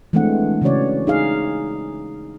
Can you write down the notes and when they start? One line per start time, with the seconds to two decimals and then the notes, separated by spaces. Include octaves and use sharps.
0.13 E3 G#3 A3 C4 D4 F#5
0.62 C#3 E3 C#4 F#4 C#5 D5
1.07 D#4 G#4 F5